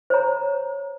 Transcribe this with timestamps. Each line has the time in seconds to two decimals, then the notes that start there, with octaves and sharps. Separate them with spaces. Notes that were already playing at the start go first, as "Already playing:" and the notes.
0.10 C5 C#5 A#5